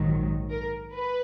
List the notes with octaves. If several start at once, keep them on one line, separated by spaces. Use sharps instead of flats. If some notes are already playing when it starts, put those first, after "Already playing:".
Already playing: A#1 G#2 D#3 F#3
A#4
B4